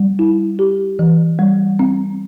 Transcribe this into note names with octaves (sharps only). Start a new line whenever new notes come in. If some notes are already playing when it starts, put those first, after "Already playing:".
Already playing: G3
E4
G4
E3
G3
C4